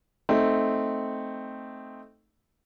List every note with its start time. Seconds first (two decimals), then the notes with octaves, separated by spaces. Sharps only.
0.29 A3 C4 D#4